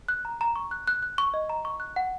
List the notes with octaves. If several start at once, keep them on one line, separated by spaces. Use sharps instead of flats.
F#6
A#5
A#5
C#6
F#6
F#6
F#6
C#6
D#5
A#5
C#6
F#6
F#5